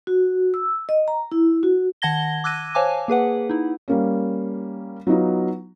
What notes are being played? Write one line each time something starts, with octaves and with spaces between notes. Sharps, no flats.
F#4
E6
D#5
A#5
E4
F#4
D#3 F#5 A5 G#6 A#6 G7
D6 E6 F#6 G#6 A#6 D#7
C5 C#5 F5 G#5 A5 D6
A#3 G#4 B4 F#5
D#4 E4
G3 A#3 C#4
F#3 B3 D#4 F4